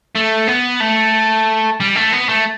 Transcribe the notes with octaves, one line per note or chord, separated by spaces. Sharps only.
A3
B3
A3
G3
A3
B3
A3